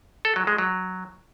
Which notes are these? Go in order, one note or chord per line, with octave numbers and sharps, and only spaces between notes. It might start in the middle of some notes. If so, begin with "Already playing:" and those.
A4
F#3
G#3
F#3